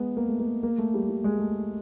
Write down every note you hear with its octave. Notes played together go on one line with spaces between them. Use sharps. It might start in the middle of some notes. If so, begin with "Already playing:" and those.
Already playing: G#3 B3
A#3
A3
A#3
A#3
A3
G3
G3
G#3
A3